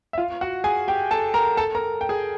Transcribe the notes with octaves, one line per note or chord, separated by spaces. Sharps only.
E5
F4 F5
F#4 F#5
G#4 G#5
G4 G5
A4 A5
A#4 A#5
A4 A5
A#4 A#5
G5
G#4 G#5